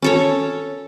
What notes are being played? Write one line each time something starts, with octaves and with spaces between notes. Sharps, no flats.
C#4 A4 C#5